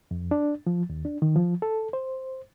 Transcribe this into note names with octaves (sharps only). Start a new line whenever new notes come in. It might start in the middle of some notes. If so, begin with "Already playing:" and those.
F2
D4
F3
D#2
D4
D#3
F3
A4
C5